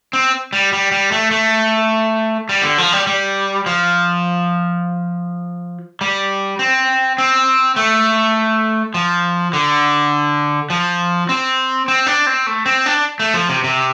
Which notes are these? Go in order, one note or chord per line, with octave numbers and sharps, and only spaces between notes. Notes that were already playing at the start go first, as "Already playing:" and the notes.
C4
G3
G3
G3
A3
A3
G3
D3
F3
G3
G3
F3
G3
C4
C4
A3
F3
D3
F3
C4
C4
D4
C4
A3
C4
D4
A3
F3
C3
C3